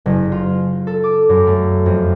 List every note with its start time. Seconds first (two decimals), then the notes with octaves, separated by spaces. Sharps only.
0.06 F#1
0.32 F4
0.87 A4
1.04 D6
1.29 F#2
1.47 A3
1.86 F2